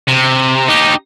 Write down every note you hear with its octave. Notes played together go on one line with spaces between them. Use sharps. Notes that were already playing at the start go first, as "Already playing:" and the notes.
C3
D#4 G4